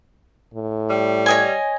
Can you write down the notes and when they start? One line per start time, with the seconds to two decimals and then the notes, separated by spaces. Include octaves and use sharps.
0.54 A2
0.90 G3
1.26 C#5 D#5 G#5